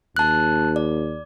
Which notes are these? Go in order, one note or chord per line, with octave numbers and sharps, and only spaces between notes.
D#2 A5 F#6
D5